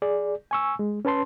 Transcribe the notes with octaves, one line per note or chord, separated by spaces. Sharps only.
G#4 D5
G#5 C#6 E6
G#3
C#4 B4 A5 C6